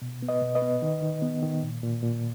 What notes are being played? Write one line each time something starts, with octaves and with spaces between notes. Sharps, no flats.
B2
B3
B4 D#5
B2
B4 D#5
B3
D#3
D#3
B3
D#3
A#2
A#2
A#2